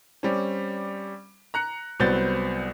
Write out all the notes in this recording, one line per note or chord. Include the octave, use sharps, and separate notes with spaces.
G3 C4 C#4
A#5 F#6 C#7
C2 F#3 B3 C4 G6 A6